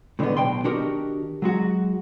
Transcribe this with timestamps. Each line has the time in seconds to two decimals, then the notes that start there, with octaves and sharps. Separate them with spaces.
0.19 A2 D3 D#3 F3 G#3 B3
0.37 B1 F2 B2 G5 C6
0.64 D#3 D4 D#4 F#4 G4 A#4
1.42 F#3 G#3 F#4